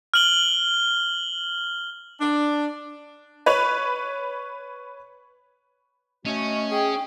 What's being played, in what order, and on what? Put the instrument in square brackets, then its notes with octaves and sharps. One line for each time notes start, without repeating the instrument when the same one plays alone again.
[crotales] F6 F#7 G7
[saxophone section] D4
[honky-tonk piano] B4 C#5 B5 F7
[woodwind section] A3 F#4 D#5 [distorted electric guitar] C#4
[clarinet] G#4 [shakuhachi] G5